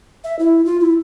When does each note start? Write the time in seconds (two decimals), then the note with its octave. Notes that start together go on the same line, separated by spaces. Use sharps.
0.24 E5
0.39 E4
0.65 F4
0.80 E4